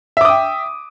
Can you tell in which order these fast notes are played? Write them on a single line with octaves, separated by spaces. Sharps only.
E5 D6 D#6 G5